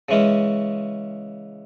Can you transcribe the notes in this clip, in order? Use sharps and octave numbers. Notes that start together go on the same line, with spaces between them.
C#3 E3 G#3 C#4